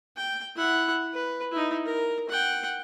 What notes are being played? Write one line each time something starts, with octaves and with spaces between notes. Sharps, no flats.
G5
E4 F#5
B4
D#4 E4
A#4
F#5 G5